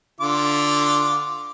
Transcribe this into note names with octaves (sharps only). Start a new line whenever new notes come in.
D3 F4 D6